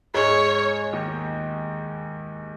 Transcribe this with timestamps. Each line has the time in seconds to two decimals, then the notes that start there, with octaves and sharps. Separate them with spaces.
0.14 G#2 G#3 C#5
0.93 D#2 D#3